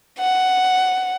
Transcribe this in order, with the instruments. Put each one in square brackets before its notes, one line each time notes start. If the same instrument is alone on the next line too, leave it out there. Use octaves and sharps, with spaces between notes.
[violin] F#5